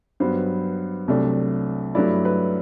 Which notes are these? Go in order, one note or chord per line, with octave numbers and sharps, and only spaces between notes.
G2 F#3 B3 C5
C2 C3 F#3 A3 D4
G2 F#3 A3 E4 D5
B4